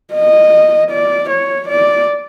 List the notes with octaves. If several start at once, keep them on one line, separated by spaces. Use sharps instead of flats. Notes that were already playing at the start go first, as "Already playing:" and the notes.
D#5
D5
C#5
D5